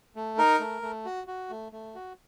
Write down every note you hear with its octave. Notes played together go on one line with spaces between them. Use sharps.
A3
D#4 A#4
A3
A3
F#4
F#4
A3
A3
F#4